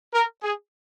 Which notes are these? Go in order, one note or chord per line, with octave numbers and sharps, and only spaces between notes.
A#4
G#4